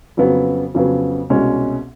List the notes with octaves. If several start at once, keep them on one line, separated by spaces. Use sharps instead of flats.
F2 C#3 F#3 B3
F2 C#3 F#3 B3
C2 B2 G#3 C#4